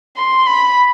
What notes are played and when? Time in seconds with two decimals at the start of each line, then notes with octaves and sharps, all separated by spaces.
0.17 C6
0.47 B5